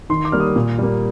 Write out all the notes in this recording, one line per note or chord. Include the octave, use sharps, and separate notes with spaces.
D#3 C6
D6
G3 A#3 F6
D#6
A#2
G3 A#3